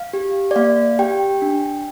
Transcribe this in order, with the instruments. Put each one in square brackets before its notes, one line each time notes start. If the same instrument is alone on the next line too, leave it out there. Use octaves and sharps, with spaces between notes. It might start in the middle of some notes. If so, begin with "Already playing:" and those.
Already playing: [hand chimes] F5
G4
D5
A#3 F5
G4 G5
D4